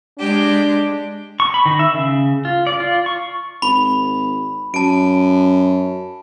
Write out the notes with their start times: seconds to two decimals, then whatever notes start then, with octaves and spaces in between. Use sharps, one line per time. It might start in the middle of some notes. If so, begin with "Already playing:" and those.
0.18 G#3 D4 G4
1.40 C#6
1.54 B5
1.65 D#3
1.79 E5
1.94 C#3
2.45 F4
2.67 D5
2.80 F4
3.06 C#6
3.62 G#1 B5
4.74 F#2 A5 D7